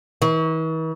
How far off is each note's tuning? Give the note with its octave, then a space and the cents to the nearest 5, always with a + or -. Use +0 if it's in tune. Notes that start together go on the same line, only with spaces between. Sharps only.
E3 -45